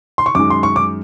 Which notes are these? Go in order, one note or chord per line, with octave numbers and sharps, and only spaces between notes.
C6
C#6
F#2 D#3 G#3 D6
C6
C#6
D6